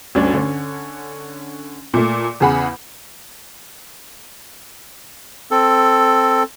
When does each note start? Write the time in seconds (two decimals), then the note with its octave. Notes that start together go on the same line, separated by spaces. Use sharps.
0.15 D2 G2 C#4 D4
0.34 D3 C#4
1.94 A#2 A3
2.40 E2 C#3 G#4 F#5 B5
5.51 C4 A4